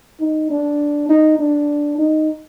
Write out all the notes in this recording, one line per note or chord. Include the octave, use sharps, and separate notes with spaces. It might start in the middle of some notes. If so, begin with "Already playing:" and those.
D#4
D4
D#4
D4
D#4